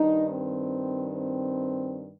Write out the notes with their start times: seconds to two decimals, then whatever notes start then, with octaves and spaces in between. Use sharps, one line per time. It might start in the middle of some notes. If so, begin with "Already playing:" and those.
Already playing: G2 D#3 D#4
0.27 C4
1.12 C4